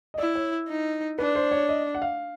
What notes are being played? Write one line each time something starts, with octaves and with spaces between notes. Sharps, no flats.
D#5
E4 D5
C#5
D#4
D4 B4
C5
C#5
D#5
F#5
F5